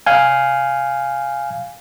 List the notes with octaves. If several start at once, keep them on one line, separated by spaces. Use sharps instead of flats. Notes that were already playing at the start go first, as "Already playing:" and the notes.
F5 G#5